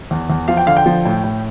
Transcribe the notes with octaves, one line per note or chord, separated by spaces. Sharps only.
E2
E2
F3 F5
G5
D3 F5
G5
F3
A2
A2